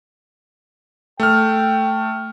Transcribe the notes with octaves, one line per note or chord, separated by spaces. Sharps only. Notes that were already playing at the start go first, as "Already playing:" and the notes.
A3 G5 F6